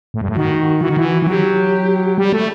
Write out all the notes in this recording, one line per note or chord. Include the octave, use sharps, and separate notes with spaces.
A2
G2
A2
D#3 F#4
E3 F#4
D#3
E3
E3
F#3 G4
G3
A3